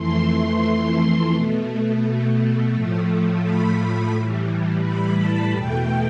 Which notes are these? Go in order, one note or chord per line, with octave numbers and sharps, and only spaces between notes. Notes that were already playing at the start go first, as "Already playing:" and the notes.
Already playing: F2 E3 A3 C6
B2 A3
A2 F3 A3
B5
A2 E3 G3
B5
A5
E2 B2 A3 G5